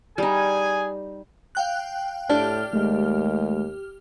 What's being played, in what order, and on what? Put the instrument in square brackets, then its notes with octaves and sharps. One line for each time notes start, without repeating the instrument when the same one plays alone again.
[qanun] G3 D#4 [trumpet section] G#4 G#5
[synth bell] F5 G5 F#6
[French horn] A2 [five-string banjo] D4 [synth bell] G4 F6
[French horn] D#2 [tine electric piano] G#3 A3